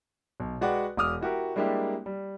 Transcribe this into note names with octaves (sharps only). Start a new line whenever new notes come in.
B1
G#3 F#4 B4 D5 F#5 G5
E1 D6 D#6 F6
E4 F#4 G4 A#4
G3 G#3 A#3 D4 E4 G4
G3